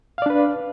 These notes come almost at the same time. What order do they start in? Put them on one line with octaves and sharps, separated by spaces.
F5 D5 D4 B4